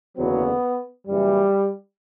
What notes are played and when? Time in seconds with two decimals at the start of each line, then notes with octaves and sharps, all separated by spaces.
0.17 F#1 E2 D3 F#3 B3
1.08 F#1 F#2 E3 G3